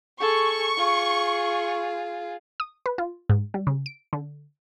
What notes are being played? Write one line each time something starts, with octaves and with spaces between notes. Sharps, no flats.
G#4 A4 C#6
F4 G#4
D#6
B4
F4
G#2
G3
C#3
D7
D3